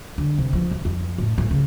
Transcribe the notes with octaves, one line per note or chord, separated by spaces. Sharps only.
D3
C3
F3
E2
F2
A2
A2
C#3